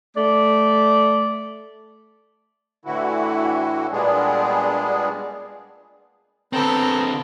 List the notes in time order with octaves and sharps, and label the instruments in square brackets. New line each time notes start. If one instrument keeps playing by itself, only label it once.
[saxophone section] A3 D5
[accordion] A2 D3 E3 E4 F#4
A#2 G3 G#3 B3 D4 G#4
[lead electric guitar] D3 C4 [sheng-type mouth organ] B3 G5 A#5 [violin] A4